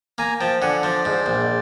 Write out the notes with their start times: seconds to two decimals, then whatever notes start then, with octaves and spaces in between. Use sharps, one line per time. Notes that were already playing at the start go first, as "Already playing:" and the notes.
0.18 A#3 G#5 A#5
0.40 F3 G5 A5
0.62 D3 F#5 G#5
0.83 F3 C5 D5
1.05 G#2
1.26 A#1